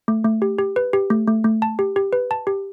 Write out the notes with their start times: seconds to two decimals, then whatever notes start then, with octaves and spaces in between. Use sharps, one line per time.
0.08 A3
0.24 A3
0.42 G4
0.59 G4
0.76 B4
0.93 G4
1.10 A3
1.27 A3
1.44 A3
1.62 A5
1.79 G4
1.96 G4
2.13 B4
2.31 A5
2.47 G4